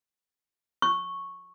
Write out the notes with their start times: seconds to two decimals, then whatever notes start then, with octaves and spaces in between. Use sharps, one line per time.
0.82 C#6